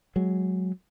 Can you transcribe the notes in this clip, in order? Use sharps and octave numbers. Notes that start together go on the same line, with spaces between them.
F#3 G#3